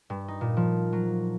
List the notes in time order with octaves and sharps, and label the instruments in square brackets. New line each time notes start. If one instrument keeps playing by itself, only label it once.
[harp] G2
D#4
A#2
F3
F#3